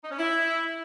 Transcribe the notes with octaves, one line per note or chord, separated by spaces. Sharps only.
D#4
C#4
E4